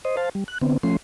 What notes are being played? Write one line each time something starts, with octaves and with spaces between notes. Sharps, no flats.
C5 D#5
C5 F5 A5
G3
F#6
D3 B3 C4
F3 A3 C#4 C6